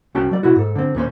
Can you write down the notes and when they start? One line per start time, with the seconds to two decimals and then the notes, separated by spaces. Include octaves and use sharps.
0.15 C2 C#4 F#4 G5 A5
0.31 F#3 D5
0.43 B2 E4 F#4
0.56 G#2 A4
0.75 D3 C4
0.95 D#2 A#2 C#4 C5